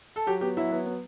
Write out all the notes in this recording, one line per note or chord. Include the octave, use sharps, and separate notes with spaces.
A4
F#3 G4
B3 G4
F#3 E4
B3
B3